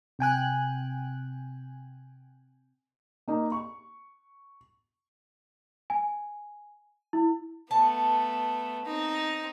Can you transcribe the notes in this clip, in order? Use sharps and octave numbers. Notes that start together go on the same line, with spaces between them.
C3 G5 G#5 F#6
A#3 D#4
C#6
G#5
E4
A3 B3 A5
C4 D#4